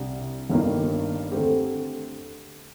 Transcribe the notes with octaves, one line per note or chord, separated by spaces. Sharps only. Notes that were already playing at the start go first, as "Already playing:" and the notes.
Already playing: C2 C3 G3 D4 G4
G1 G2 D#3 A#3
D3 A3 C4 G4